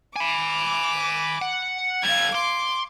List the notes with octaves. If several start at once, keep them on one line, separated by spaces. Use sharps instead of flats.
G#5 B5 D6
F#5
G3 A4 F5 G#6
C6 D6